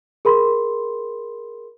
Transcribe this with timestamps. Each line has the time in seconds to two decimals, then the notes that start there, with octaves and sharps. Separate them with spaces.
0.25 G#4 A#4 B5 C6